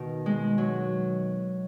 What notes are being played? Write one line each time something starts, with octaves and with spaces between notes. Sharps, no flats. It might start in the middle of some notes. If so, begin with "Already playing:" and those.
Already playing: B2 D#3
G#3
F#3